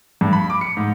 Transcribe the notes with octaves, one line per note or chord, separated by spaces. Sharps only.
G2
B5
D6
C#7
G#2